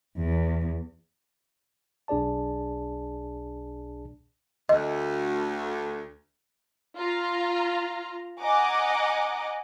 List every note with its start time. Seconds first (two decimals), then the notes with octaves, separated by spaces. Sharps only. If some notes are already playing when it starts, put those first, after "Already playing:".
0.17 E2
2.08 B1 D4 G#4 D5 A5
4.69 D2 D#5
6.97 F4 A#5
8.41 D#5 F#5 G#5 A#5 D6